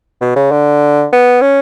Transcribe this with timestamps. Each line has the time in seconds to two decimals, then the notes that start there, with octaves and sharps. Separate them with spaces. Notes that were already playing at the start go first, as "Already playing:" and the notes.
0.21 B2
0.36 C#3
0.51 D3
1.12 B3
1.42 C#4